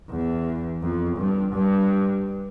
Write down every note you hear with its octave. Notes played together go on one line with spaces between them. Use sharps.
E2
F2
G2
G2